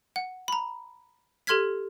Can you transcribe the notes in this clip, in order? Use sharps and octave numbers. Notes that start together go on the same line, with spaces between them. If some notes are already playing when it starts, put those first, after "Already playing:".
F#5
A#5 B5
G4 A4 C6 F6 G#6 B6